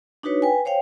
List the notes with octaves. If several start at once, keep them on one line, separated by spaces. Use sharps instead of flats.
D4 D#4 F#4 B4 C#5
B4 G5 G#5
C5 C#5 F5 G5